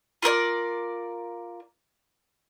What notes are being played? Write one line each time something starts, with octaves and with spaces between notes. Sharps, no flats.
F4 A4 A#4 D5